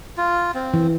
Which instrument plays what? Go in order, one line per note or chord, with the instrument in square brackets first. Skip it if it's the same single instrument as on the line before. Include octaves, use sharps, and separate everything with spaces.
[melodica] F4
C4
[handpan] E3